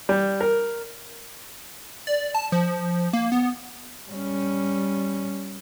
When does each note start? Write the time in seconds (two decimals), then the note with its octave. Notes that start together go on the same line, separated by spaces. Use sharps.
0.09 G3
0.41 A#4
2.07 D5
2.35 A5
2.52 F3
3.13 A#3
3.32 B3
4.10 G3 C#4